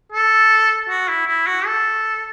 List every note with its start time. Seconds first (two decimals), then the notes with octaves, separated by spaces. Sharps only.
0.12 A4
0.89 F#4
1.09 E4
1.27 E4
1.47 F#4
1.66 A4